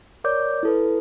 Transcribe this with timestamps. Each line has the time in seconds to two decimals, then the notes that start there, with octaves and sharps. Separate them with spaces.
0.24 A#4 C#5 D5 D6 G6
0.63 E4 A4 B4